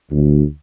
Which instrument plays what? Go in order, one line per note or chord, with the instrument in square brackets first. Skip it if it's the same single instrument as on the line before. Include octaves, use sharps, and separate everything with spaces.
[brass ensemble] D2